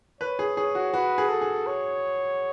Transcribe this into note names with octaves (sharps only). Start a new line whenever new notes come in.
B4 C#5
G#4
G#4 C#5
F#4
F#4 B4
G#4
A4
G#4
C#5